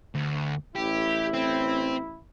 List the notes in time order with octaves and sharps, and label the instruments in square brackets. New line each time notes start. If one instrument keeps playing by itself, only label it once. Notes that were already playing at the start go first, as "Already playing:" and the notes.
[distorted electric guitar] D2
[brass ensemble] A1 E4 [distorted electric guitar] G4
[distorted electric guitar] C4